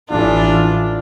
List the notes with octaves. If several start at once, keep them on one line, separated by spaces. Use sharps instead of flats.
A1 E3 D4 F4